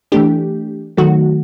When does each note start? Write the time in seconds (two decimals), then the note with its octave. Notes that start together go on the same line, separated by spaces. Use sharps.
0.12 E3 A3 D4 G4
0.97 D#3 F#3 A3 F#4